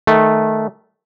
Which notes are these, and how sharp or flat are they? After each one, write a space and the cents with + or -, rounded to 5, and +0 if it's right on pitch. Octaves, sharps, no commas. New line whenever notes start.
D#3 +0 A3 -10